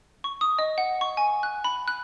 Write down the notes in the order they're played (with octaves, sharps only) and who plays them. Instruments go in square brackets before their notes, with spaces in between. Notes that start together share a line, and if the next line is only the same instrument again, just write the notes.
[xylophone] C#6
D#6
D#5
F#5
C#6
G#5
F#6
B5
F#6